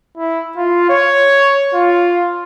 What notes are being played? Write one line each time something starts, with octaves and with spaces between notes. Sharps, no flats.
E4
F4
C#5
F4